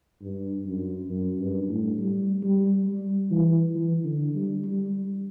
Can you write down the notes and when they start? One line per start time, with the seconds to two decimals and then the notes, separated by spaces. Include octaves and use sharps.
0.21 G2
0.66 F#2
1.10 F#2
1.39 G2
1.69 A2
1.98 G3
2.42 G3
2.86 G3
3.31 E3
3.75 E3
4.04 D3
4.34 G3
4.64 G3